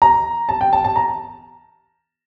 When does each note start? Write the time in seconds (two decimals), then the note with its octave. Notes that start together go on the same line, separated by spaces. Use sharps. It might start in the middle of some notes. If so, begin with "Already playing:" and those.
0.02 A#5
0.49 A5
0.61 G5
0.73 A5
0.84 A5
0.96 A#5